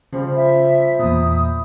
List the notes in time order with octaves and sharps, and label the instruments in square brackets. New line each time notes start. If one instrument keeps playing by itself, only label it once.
[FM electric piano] C#3 [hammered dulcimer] F3 G3
[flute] E5
[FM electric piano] E2 A#2 [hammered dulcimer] D#4 E4 [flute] D#6